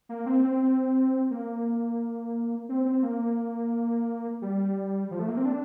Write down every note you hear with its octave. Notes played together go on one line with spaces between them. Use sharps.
A#3
C4
C4
A#3
C4
C4
A#3
G3
F3
A3
A#3
C4
D4